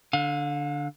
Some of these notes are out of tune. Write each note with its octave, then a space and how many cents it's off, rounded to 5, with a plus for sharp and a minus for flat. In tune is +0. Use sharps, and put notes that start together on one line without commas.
D3 +0 F5 +35